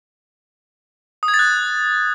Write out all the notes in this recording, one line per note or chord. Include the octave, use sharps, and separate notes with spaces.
D#6
G#6
A6
F#6